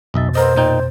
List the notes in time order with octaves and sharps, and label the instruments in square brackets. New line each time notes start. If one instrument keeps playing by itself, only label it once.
[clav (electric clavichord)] B1 D#5 E5 [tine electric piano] F2 B2 A6
[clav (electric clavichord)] B3 A#4 D#5 [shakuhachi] C5
[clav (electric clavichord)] A#2 D#4 G5